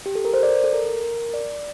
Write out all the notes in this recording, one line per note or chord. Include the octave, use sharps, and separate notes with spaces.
G4
A4
A#4
C5
D5
A4
A#4
A#4
D5